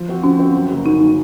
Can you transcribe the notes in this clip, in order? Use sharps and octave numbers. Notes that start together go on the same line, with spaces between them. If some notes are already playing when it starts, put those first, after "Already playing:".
Already playing: F3
C4 F#4
F3 C#4
C4 F#4
F#2
C#3 F#3 A#3
F#2 D#4
C#3 F#3 A#3